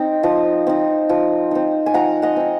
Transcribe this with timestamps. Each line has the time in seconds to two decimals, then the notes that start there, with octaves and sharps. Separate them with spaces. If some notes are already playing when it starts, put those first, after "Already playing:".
Already playing: C4 D#4
0.23 F3
0.67 C4 D#4
1.09 F3
1.51 C4 D#4
1.86 G#5
1.94 F3 F#5 A#5
2.22 D#5 F#5
2.36 C4 D#4